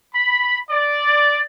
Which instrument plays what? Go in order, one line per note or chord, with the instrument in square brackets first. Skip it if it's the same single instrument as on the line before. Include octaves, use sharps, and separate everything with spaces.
[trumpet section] B5
D5